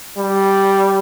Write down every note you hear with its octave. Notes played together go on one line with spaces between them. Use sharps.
G3